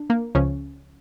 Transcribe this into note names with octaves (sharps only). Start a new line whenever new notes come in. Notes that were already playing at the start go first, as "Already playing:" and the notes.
Already playing: D4
A#3
C#2 C#3 F3 C#4